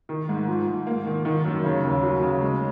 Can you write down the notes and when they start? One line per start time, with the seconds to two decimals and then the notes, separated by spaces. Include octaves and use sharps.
0.09 D#3
0.29 G#2
0.48 F3
0.67 G#2
0.87 A#3
1.06 D#3
1.25 D#3
1.45 F#2
1.64 C#3
1.84 D#2
2.03 F#3
2.23 C#3
2.41 G#3